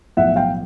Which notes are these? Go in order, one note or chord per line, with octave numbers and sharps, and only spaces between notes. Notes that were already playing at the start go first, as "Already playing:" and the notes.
B1 A2 F3 E5 F#5
F5 G5